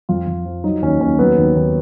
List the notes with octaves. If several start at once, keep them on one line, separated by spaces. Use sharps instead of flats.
F2 F4
F2
F3
F#3 D#4
D#2 C#4
D#2 C#4
F#3 B3
D#2
D#2